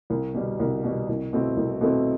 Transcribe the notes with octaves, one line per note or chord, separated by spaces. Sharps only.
C2
B2 G3
C2
B2 G3
C2
B2 A3 C4 E4
C2
B2 A3 C4 E4